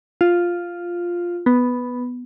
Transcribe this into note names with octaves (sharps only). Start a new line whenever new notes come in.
F4
B3